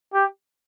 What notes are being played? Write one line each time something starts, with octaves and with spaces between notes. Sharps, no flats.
G4